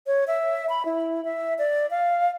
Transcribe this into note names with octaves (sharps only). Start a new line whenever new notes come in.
C#5
E5
B5
E4
E5
D5
F5